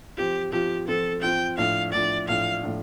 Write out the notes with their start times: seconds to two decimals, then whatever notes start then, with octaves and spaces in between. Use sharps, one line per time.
0.17 F3 C4 F4 G4
0.52 F3 C4 F4 G4
0.88 F3 C4 F4 A4
1.22 F3 C4 F4 G5
1.57 A2 F3 D4 F5
1.92 A2 F3 D4 D5
2.28 A2 F3 D4 F5
2.63 A2 F3 D4